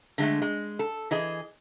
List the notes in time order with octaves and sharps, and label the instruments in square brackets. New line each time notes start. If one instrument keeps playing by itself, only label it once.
[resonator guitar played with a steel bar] D3 G#3 A3
G#3
A4
E3 G#4 D#5